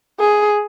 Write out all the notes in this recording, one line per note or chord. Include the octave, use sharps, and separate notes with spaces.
G#4